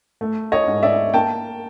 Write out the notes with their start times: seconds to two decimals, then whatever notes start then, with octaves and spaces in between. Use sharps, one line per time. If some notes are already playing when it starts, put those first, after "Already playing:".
0.21 A3
0.52 C#5 D#5
0.68 G#2
0.83 D5 E5
1.14 A#3 G5 A5